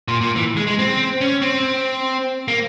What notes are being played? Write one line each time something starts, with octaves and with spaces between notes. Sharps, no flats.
A#2
A#2
E3
G#3
G#3
C4
C#4
C4
A#3